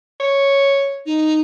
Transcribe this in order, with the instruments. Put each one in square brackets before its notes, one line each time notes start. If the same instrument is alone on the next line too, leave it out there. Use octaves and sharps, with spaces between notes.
[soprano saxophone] C#5
[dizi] D#4